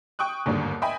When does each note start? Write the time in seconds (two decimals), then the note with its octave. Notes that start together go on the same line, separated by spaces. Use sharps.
0.19 G5 C#6 D#6 F#6
0.46 G1 D#2 G#2 D3 G3
0.82 D#5 E5 G5 G#5 B5